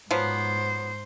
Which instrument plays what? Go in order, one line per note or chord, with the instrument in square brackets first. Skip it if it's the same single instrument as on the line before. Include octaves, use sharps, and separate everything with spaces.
[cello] G#2 C5 [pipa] F3 F#3 B3